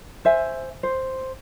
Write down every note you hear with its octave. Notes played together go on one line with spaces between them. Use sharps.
C5 E5 G#5
C5